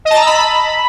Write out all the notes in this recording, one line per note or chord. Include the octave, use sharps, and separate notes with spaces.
D#5
A5
A#5
E6
B5